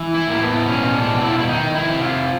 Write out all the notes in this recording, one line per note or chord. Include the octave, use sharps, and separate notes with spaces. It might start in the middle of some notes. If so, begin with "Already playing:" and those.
Already playing: E3
E4
A2 A#3
B3
B2 C#4
D4
B2
E4
F4
E4
D#3 D#4
E4
C3
F4